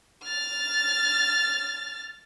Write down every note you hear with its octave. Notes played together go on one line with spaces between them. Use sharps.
F6 A6